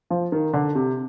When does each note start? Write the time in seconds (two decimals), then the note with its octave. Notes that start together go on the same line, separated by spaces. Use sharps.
0.10 F3
0.32 D#3
0.53 D3
0.75 C3